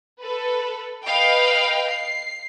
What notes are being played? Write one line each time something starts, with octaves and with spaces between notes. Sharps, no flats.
A4 B4
B4 D#5 F5 G5
C7